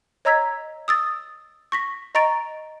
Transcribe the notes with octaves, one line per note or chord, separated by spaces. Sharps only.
C#5 D#5 A#5 E6 G#6 B6
D#6 E6 A6
C#6 A#6 B6
D#5 A#5 C#6 A6 D7